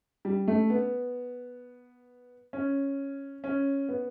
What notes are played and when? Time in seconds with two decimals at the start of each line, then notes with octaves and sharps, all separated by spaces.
0.25 G3
0.48 A3
0.70 B3
2.53 C#4
3.44 C#4
3.89 B3